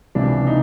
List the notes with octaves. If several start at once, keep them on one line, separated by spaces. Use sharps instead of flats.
C#2 C3 E3 D4
D#4